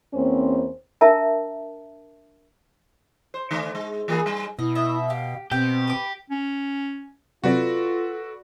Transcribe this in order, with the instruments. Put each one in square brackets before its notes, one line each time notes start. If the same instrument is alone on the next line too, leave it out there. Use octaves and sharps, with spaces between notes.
[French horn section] E2 A#3 C4 C#4 C5
[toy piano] D4 A#4 E5 A5 A#5
[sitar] C5
D3 A3
G#3
E3 A#3 G#4
G3
[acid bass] B2 [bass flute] E4 [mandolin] D#5
[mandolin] D#5 E5
[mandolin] G4 [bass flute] F5
[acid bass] B2 [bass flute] C4 [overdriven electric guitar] G4 [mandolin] G5
[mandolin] B4 D6
[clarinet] C#4
[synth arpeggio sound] C3 F#3 C4 [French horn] F4 [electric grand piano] F#4 B4 D5 [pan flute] A4